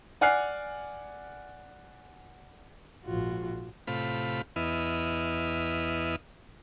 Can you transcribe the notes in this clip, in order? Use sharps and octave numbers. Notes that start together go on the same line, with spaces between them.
D5 F#5 G#5 F6 F#6 C7
A#1 G#2 F4 F#4
A2 C3 F4 B5
E2 B3 E4 D#5 F6